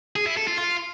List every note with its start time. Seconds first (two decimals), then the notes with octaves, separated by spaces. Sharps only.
0.16 G#4
0.26 E4
0.37 A4
0.47 F4
0.58 F4